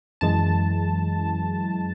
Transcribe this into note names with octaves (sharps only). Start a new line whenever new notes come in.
F#2 E3 G#3 A5